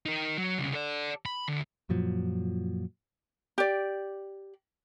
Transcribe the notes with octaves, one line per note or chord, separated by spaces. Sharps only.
D#4 A#4
F#3
C2 C#3
A4 D5
B5
D2
F#2 A#2 F3 F#3
G4 D5